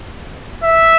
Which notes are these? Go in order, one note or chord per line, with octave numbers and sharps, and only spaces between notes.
E5